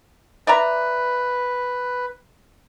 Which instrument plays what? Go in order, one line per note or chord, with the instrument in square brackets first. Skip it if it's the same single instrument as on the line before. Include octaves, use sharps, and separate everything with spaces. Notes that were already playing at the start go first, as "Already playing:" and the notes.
[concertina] B4 [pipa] D5 E5 A#5